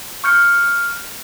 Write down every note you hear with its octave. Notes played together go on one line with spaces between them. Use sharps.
C#6 F6 G6 C#7